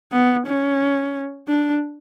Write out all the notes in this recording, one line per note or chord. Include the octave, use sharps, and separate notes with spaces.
B3
C#4
D4